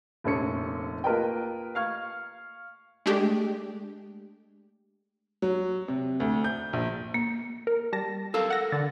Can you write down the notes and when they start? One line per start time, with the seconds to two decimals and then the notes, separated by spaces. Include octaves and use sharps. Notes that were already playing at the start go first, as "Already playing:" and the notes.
0.24 F1 A#1 C#4 C#7
1.04 A#3 F4 A#4 B4 D#5 G5
1.75 F5 C#6 F6 G#6
3.06 G#3 A3 D4 G4
5.42 F#3
5.88 C3
6.20 D2
6.44 G6
6.73 A#1
7.14 A#3
7.67 A#4
7.92 G3 A5 A#6
8.34 A4 A#4 F5 E6
8.50 F#5 E6 A#6
8.72 D3 A6